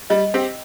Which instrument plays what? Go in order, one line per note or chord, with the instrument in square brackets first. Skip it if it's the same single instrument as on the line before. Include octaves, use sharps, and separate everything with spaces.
[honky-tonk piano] G3 [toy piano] D#5
[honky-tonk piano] C4 G4 [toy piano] G5